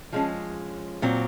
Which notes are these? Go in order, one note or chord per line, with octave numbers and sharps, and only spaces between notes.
F3 G#3 C#4
A#2 F#3 C4